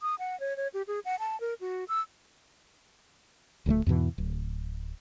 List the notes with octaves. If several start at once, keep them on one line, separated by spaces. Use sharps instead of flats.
D#6
F#5
C#5
C#5
G4
G#4
F#5
A5
A#4
F#4
E6
D1 D2 F3 A3
E2 G#2 B2 E3
D1